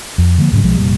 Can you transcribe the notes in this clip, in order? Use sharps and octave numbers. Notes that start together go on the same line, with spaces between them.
F2
D3 F3 G#3 A#3
E1 G#2 C#3 F#3
B1 F3 G#3
F1 A#2 G3